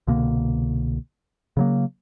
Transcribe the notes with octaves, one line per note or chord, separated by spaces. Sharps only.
C2 B2 D3 A#3
C#3 F#3 A#3